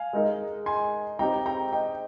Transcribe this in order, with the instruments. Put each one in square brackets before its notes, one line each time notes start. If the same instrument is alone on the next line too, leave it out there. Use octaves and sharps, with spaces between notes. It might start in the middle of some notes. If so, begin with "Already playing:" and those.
Already playing: [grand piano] F5 G#5
[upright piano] G#3 D#4 A#4 D#5
[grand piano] G#5 C6
[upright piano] C4 D#4 G4 C5 [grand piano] G5 A#5
[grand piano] G5 A#5
D#5 G5